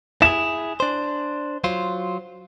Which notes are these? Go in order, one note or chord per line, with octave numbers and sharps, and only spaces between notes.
E4 G#4 E7
D4 C5
F#3 F4 C5